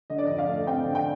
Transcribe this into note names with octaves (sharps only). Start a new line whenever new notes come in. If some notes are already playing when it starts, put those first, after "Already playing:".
D3 D#5
D5
F2 D#5
F5
A3
C4 G5
D3
G5